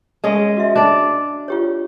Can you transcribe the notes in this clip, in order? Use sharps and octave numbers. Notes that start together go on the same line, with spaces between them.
G#3 C#4 D#5
F#4 E5
D4 D5
F4 G4 C#5